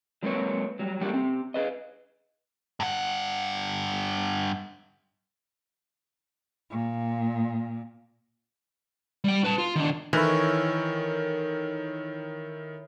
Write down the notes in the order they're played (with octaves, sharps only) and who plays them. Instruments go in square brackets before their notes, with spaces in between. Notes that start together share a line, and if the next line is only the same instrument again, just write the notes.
[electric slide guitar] F#3 G#3 A#3 C4 B4 C#5
F#3 G3
G3 A3 A#3 D4 F#4 G4
C4 G4
G#4 B4 D#5
[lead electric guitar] G2 F#5
[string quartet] A#2
[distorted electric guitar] G3 G5
B4 A5
F4
D#3 D4
[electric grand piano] D#3 A4 A#4 [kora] E3 [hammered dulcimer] E4 C#5